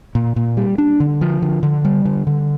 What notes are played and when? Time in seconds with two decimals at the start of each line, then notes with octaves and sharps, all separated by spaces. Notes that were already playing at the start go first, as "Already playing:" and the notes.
0.15 A#2
0.36 A#2
0.57 G3
0.78 D4
1.00 D3
1.21 F3
1.42 D3
1.63 D3
1.85 G3
2.05 D3
2.27 D3